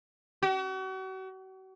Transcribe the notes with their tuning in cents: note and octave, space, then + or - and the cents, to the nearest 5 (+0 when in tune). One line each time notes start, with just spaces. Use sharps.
F#4 +40